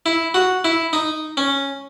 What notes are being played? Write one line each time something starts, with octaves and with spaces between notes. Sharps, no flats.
E4
F#4
E4
D#4
C#4